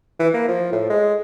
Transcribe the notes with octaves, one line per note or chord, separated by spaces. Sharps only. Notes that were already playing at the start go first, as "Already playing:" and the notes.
E3
A#3
F3
A2
G#3